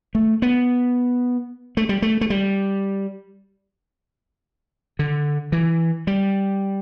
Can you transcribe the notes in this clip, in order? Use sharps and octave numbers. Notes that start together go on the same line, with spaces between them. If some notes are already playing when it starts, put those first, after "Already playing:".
A3
B3
A3
G3
A3
A3
G3
D3
E3
G3